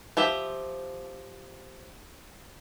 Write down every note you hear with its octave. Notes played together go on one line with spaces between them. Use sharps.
F3 G4 E5